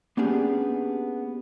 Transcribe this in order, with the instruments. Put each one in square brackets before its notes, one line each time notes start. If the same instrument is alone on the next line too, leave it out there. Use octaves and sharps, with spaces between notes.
[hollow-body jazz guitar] A#3 B3 C#4 D4 G4 G#4